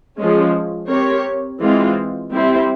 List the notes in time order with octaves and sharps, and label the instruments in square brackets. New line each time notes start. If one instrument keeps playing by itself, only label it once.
[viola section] F3 G#3 C#4
C4 G4 A#4 C#5
E3 G#3 C4 F4
G3 C4 E4